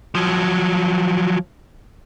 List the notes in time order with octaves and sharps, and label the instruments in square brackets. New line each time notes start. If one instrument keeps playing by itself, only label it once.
[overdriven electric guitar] F3 F#3